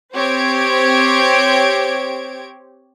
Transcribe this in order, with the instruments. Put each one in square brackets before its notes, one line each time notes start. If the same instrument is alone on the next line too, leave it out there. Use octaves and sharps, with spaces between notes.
[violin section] C4 G4 C5 C#5 G#6 D7